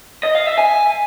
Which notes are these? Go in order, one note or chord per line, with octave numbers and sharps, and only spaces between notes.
D#5
F5
E5
G#5